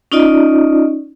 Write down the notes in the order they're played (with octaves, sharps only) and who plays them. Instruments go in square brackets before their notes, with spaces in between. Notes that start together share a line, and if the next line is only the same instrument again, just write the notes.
[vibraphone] C#4 D#4 F4 D5 D#5